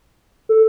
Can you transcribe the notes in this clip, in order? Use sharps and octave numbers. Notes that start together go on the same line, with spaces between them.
A4